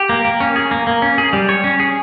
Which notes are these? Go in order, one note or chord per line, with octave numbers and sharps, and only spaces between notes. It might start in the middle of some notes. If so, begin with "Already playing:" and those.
Already playing: G4
A#3
A#3
C#4
G#4
A#3
A#3
C#4
G#4
G3
C#5
C#4
G#4